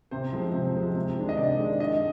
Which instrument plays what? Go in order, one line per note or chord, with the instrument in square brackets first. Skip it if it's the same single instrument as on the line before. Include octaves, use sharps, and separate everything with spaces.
[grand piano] C3 C5
F3 G#3 C4
C3
F3 G#3 C4
C3
D#3 G#3 D4
D#5
C3 D5
D#3 G#3 D4
D#3 D#5